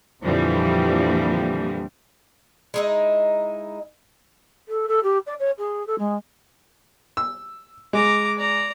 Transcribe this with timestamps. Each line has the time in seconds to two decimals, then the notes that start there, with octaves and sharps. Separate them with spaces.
0.24 F2 A#2 D3 E3 F3 G3
2.74 G#3 D#4 E4
4.68 A4
4.88 A4
5.03 G4
5.26 D5
5.39 C#5
5.58 G#4
5.87 A4
5.98 G#3
7.17 E6
7.93 G#3 A#5 D6
8.38 D5 A#5